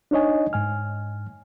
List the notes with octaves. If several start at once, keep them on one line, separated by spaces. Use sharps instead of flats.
D4 D#4 C#5 D#5 G#5
G#2 G#5 F6